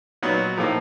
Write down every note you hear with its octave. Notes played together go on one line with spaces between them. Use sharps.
A#2 F#3 B3 D#4 F#4
A2 F3 A#3 D#4